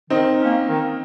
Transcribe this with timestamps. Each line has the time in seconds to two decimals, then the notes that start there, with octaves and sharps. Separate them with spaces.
0.10 D#3 C4 D#4
0.39 A#3 C#4
0.68 D#3